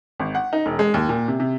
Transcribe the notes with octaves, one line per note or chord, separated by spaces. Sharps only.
G#1
F#5
D#4
E1
G#3
D#2
A#2
C3
C3